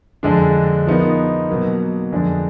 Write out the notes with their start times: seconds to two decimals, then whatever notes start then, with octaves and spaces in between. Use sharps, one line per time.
0.23 F2 D3 G#3 D4
0.87 F3 B3 D#4 A#4
1.49 B2 F#3 A#3
2.12 F2 D3 G#3 D4 G#4